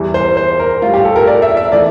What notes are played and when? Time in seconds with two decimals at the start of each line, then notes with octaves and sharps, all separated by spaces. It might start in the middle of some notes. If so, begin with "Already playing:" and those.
Already playing: E2 E3 G3
0.14 C5
0.37 C5
0.59 A#4
0.82 A2 F4
0.86 G3
0.94 G4
1.05 A4
1.16 A#4
1.27 D5
1.42 E5
1.57 E5
1.72 E3 A3 D5